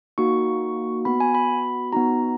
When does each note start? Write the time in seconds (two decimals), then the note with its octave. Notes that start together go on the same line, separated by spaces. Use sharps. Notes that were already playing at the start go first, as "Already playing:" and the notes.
0.18 A#3 D#4 F#4 C#6
1.05 B3 F#4 B5
1.20 G#5
1.35 B5
1.92 B3 D#4 F#4 A#5